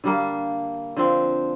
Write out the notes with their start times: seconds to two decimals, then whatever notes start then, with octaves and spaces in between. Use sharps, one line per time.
0.04 D3 G3 A#3
0.96 D3 F3 C4